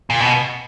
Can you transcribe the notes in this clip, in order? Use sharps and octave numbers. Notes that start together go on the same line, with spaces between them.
A#2
B2